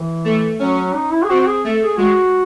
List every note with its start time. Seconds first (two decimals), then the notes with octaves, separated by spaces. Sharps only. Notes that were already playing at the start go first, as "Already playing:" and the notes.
Already playing: E3
0.25 A3
0.59 F#3 C#4
0.94 D#4
1.12 E4
1.23 G#4
1.29 C4 F#4
1.40 F#4
1.46 G#4
1.64 A3
1.82 G#4
1.98 G#3 F#4